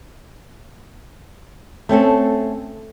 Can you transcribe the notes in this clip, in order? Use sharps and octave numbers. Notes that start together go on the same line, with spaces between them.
A3 C4 C#4 A4